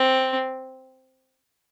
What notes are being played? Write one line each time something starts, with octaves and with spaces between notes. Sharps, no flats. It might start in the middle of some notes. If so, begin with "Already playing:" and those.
Already playing: C4